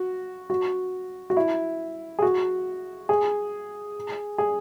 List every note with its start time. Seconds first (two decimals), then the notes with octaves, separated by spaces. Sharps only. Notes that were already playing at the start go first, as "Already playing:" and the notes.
Already playing: F#4
0.50 F#4
1.30 F#4
1.37 E4
2.19 G#4
2.22 F#4
3.09 G#4
4.38 G#4